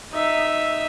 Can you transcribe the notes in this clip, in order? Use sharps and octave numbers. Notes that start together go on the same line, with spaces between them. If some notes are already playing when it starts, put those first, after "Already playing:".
D#4 E5